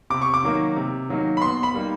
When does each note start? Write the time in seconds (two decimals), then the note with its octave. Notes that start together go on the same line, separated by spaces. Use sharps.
0.10 C3 D6
0.22 C#6
0.34 D6
0.43 D#3 F#3 A#3 D#4
0.76 C3
1.09 D#3 F#3 A#3 D#4
1.37 B5
1.42 B2 C6
1.63 B5
1.74 G3 A#3 D#4